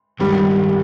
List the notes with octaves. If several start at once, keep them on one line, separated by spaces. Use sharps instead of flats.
G2 D#3 G3 G#3